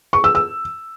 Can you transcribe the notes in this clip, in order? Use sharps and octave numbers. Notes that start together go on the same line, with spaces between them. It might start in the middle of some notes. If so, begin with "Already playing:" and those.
C#6
E6
E6